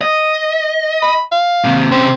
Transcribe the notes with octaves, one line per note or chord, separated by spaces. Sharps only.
D#5
B5
F5
D#2 C3
C3 C4 C#4